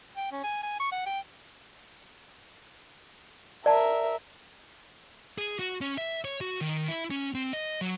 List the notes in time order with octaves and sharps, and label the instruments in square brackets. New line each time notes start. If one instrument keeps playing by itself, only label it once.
[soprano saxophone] G5
C#4
G#5
G#5
C#6
F#5
G5
[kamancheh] A#4 E5 [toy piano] D5 A5
[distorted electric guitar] G#4
F#4
C#4
E5
C#5
F#4
D#3
E4
C#4
C4
D#5
F#3